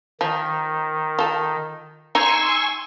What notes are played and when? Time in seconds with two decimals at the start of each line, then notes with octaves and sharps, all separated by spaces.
0.21 D#3 F3
1.19 F4 A4
2.15 D#4 G#5 C6 C#6 E6